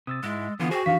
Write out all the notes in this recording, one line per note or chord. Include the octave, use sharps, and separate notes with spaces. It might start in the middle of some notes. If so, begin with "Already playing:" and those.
C3 D#6 E6 A6
G#2 G#3 E4
D3 E3 B3 F4
F#4 G#4 C5 G5
F2 D#3 E3 D4 G4 F5 B6